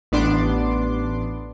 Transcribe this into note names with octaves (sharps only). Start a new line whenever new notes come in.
A1 B3 D4 C6 D6